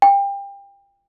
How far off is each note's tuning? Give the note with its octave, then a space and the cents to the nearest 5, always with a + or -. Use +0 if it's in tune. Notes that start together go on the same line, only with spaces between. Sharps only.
G5 +25